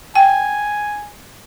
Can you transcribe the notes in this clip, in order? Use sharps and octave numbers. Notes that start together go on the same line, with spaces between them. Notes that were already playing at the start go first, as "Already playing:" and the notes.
G5 G#5